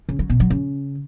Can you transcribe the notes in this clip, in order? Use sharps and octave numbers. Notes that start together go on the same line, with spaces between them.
C#3
F#3
B2
F#3
C#3